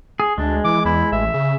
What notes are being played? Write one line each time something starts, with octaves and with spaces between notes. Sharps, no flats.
G#4
D2 G#3 D4
E3 D6
E2 E4
A1 E5
C#3